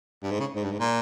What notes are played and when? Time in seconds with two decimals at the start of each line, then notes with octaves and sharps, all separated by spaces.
0.23 G2
0.31 G#2
0.40 C#3
0.56 G#2
0.64 G2
0.72 G#2
0.80 A#2